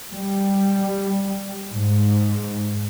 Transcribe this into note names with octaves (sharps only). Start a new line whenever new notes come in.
G3
G#2